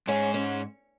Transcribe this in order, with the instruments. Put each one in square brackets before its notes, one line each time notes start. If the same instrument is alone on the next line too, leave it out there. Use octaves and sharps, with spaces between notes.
[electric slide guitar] G#2 G#3 [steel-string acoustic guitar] C#4
[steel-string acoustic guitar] C#4